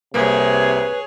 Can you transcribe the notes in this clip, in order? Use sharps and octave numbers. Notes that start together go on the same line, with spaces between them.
C2 C3 A#3 G#4 B4 C#5